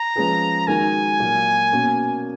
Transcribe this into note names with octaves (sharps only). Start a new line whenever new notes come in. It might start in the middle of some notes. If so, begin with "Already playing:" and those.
Already playing: A#5
F3 G#3 C#4 G#4 B4
D#3 G#3 D#4 F#4 A#4 G#5
A#2 F#3 A#3
B2 A#3 C#4 F#4